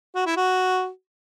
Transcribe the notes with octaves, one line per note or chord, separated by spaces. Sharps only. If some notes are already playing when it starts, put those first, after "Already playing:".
F#4
E4
F#4